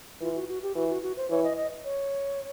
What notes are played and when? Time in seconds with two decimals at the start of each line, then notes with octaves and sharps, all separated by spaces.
0.21 E3 F4
0.35 F#4
0.49 F#4
0.63 G4
0.75 E3 F#4
0.89 F#4
1.02 F#4
1.17 C5
1.30 E3 C#5
1.44 D#5
1.57 D#5
1.84 C#5